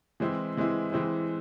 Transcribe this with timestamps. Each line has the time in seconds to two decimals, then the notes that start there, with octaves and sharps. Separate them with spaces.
0.20 E3 G#3 C4 E4
0.57 E3 G#3 C4 E4
0.92 E3 G#3 C4 E4